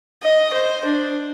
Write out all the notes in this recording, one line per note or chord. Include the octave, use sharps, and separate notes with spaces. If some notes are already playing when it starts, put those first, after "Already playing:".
D#5
C5
D4